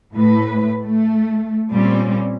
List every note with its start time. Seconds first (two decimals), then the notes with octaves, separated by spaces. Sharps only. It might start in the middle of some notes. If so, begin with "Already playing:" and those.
0.13 A2 B4
0.82 A3
1.71 A#2 G3 C4 C#4